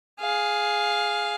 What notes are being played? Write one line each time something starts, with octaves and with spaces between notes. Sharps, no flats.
G#4 F5